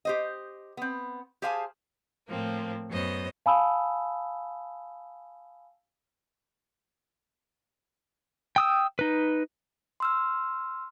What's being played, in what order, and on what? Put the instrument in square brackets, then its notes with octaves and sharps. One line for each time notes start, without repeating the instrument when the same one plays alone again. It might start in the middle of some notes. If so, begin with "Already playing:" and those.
[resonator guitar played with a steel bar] G4 C5 D#5
B3 C4
G4 G#4 C5 F5 G#5 A5
[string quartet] A2 F3 A#3 C4
F#2 B3 C5 D#5
[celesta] F5 G#5 A5 B5 D#6 E6
[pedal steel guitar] G5 D#6 E6
D#4 B4
[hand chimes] C6 E6 F6